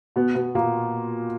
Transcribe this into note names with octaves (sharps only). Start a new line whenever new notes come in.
B2 B3
B2 B3
A#2 A#3